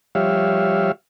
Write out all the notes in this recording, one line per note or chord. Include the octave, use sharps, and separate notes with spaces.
F3 G3 G4 C#5 E5 F5